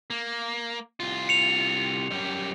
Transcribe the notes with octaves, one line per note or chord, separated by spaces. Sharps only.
A#3
C2 F4
C#7 F7
F#2 G3